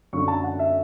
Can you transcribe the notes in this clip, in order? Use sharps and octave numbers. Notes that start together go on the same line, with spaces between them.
F#2 D3 A3 C#6
A5
F#5
E5